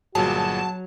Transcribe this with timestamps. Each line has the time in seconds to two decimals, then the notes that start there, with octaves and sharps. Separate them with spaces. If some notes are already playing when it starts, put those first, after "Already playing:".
0.15 G1 A#2 F#3 F#4 G#4 A5